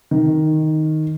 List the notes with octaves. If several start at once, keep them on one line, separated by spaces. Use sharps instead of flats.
D#3